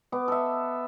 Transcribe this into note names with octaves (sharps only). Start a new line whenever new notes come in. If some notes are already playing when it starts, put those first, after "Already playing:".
B3 D6
A4 E5